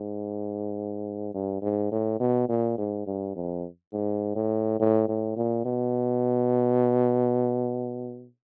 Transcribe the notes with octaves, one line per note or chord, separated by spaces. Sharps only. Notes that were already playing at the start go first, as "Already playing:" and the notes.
Already playing: G#2
G2
G#2
A2
B2
A#2
G#2
G2
F2
G#2
A2
A2
A2
A#2
B2